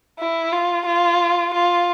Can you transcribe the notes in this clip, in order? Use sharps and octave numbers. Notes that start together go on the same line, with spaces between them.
E4
F4
F4
F4